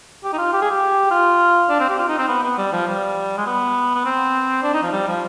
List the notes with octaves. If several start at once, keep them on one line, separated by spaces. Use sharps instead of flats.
G4
D#4
F4
G4
G#4
G4
F4
D4
C4
G4
F4
D#4
C4
B3
B3
G3
F3
G3
G#3
B3
B3
C4
D4
D#4
F3
G3
F3